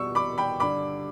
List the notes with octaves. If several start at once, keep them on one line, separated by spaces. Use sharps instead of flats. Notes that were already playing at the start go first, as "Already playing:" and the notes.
Already playing: B2 G3 C#6 E6
B5 D6
G5 B5
G2 D3 G3 B5 D6